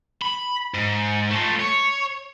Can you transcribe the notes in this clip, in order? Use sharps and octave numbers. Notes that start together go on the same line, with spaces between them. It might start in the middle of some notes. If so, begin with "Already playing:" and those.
B5
G#2
A3 F4
C#5